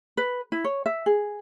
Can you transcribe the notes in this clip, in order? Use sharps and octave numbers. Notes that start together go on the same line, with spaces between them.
B4
E4
C#5
E5
G#4